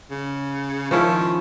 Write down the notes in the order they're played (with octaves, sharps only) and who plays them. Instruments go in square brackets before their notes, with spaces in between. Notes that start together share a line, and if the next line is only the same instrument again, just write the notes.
[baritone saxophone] C#3
[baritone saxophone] D#3 [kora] F3 C#4 E4